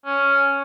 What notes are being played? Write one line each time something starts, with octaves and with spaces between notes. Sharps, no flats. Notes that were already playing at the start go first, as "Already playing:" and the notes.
C#4